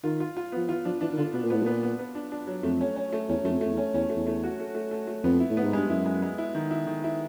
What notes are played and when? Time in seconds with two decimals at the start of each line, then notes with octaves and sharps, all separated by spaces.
0.04 D#3 F4
0.20 F4
0.37 F4
0.52 F3 B3
0.69 E3 F4
0.85 F3 D4
1.01 E3 D4
1.13 D#3
1.18 D3 F4
1.33 B2 B3
1.44 A#2
1.50 A2 B3
1.63 A#2 B3
1.83 B3
1.99 B3
2.15 D4
2.32 D4
2.47 F#3
2.63 F2 A3
2.81 C#4
2.96 C#4
3.13 A3
3.29 E2 C#4
3.43 F#2 A3
3.50 F2
3.61 A3
3.66 F2
3.73 E2
3.77 C#4
3.94 E2 C#4
4.10 A3
4.15 E2
4.27 A3
4.43 F#4
4.60 A3
4.75 A3
4.91 A3
5.07 A3
5.24 F2 B3
5.40 E4
5.50 A2
5.57 B3
5.64 G#2
5.73 G2 G#3
5.89 F#2 E4
6.06 G#3
6.22 G#3
6.38 E4
6.55 D#3
6.71 E4
6.87 D#3
7.04 E4